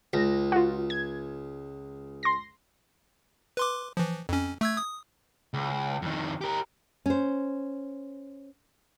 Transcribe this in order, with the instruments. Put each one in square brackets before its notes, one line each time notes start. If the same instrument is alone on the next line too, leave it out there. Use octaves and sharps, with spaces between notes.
[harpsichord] C#2 [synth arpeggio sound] A#6
[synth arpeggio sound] F4 F#4
G#6
C6 A#6
[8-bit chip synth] B4 C6 D6
E3 F3
F2 C#4
A3 E6 G#6
D#6
[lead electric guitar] C#2
F2 D#3
G4 A#4
[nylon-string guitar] C#4 C5